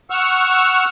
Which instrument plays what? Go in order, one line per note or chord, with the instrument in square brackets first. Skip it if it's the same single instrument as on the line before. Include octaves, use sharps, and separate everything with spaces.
[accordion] F#5 C#6 E6 F6